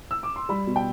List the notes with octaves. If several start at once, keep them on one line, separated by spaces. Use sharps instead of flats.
E6
D6
C6
G3 B5
B2
G5